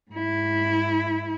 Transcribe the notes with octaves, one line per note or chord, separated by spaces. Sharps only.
G#2 E4